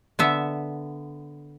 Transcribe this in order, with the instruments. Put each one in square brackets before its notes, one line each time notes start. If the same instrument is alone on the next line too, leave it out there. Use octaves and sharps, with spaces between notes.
[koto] D3 B3 E5